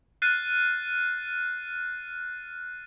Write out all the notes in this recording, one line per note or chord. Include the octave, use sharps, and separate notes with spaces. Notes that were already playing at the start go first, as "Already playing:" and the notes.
F6 F#6 A6 C7 D#7